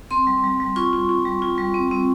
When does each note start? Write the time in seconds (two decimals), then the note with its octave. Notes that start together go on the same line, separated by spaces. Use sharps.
0.11 C4 C6
0.27 G3
0.44 G3
0.60 G3
0.76 F4 C#6
0.93 F4
1.09 F4
1.26 G3
1.42 F4
1.58 G3
1.74 C4
1.91 C4